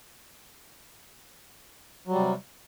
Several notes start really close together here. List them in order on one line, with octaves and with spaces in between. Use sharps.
F#3 G3 C3